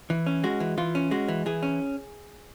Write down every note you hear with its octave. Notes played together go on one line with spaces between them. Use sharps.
E3
C#4
G#3 F#4
E3
E3 F4
C#4
G#3 F#4
E3
E3 G#4
C#4